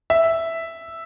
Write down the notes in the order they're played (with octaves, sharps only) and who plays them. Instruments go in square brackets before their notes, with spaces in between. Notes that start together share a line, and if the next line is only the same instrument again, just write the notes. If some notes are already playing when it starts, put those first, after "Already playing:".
[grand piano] E5